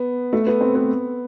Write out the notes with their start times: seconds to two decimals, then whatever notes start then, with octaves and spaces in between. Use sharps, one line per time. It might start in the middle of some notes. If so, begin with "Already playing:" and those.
Already playing: B3
0.33 A3
0.47 B3
0.61 C4
0.75 B3